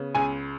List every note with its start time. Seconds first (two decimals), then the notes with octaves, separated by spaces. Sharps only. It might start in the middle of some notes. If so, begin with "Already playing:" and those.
Already playing: C#3 B3
0.15 C#2 G#5